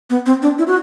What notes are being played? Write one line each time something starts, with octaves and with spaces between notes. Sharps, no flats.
B3
C4
D4
E4
F#4